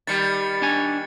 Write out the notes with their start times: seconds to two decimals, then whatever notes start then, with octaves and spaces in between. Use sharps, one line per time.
0.07 D#3 G3 A6 C#7
0.62 D4 G#5